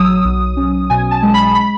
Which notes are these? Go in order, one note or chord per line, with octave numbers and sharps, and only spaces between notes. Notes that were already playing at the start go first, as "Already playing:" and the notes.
Already playing: A1 F#3 D#6 E6
B1
C#4
B2 G#5
A5
G#3
B5
B5